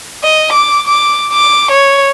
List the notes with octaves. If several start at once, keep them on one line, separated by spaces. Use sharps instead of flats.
D#5
D6
D6
D6
C#5